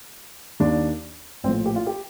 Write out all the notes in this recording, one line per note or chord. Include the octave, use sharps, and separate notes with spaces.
D#2 D#3 D4
A#1 A2 F3 C4
G4
F4
G4